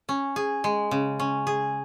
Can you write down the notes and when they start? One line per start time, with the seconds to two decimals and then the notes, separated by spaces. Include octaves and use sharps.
0.09 C#4
0.36 G#4
0.64 G#3
0.91 C#3
1.19 C#4
1.47 G#4